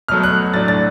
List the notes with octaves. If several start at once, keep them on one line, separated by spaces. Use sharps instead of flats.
B2 F#3 A3 F6
F#6
A2 F#3 A3 D4 A6
A6